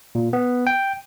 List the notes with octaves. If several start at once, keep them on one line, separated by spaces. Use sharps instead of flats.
A#2
B3
G5